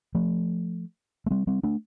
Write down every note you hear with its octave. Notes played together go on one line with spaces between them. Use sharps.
F3 A3
A3
G3 C4
G3 C4
A3 D4